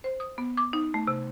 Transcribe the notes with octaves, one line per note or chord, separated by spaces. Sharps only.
C5
D#6
B3
D6
D#4
A3
C3